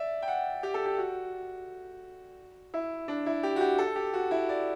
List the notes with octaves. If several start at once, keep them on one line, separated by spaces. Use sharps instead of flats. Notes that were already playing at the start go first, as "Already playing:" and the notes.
Already playing: D5 E5
G5
F#5
G4
A4
G4
F#4
E4
D4
E4
G4
F#4
G4
A4
G4
F#4
E4
D5